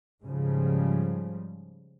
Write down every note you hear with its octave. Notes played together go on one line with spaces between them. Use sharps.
G#2 C#3 F3 G3